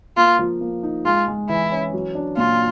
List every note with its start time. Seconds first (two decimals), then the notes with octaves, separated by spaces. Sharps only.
0.17 A#3 F4
0.39 F3
0.61 A#3
0.83 D#4
1.05 G#3 F4
1.28 G#3
1.49 E3 E4
1.72 C#4
1.93 F#3
2.15 D4
2.37 A#2 F4